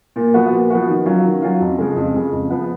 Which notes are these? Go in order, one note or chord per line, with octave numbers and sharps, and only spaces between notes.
A#2
F3 B3 F#4
A#2
F3 B3 F#4
D#3
F#3 C#4 F4
D#3
F#3 C#4 F4
F2
C#3 F3 G#3
F2
C#3 F3 G#3
F2
F3 B3